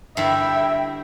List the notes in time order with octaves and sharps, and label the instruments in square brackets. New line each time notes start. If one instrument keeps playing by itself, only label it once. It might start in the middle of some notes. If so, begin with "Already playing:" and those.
[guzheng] G2 D3 E4 [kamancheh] E5 G5